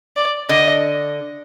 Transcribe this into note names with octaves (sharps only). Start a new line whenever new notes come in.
D5
D3 D#5